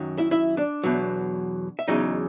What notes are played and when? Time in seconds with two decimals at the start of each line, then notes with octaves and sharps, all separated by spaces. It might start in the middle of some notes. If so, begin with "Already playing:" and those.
Already playing: F#2 D#3 F#3
0.18 E4 E5
0.31 E4 E5
0.57 D4 D5
0.84 E2 B2 F#3
1.79 E5
1.88 E2 C#3 F#3 D#4 D#5